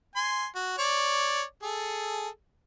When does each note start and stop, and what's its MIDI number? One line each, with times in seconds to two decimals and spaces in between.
0.16 0.46 80
0.16 0.46 84
0.55 0.74 66
0.79 1.43 73
0.79 1.43 74
1.63 2.28 68
1.63 2.28 69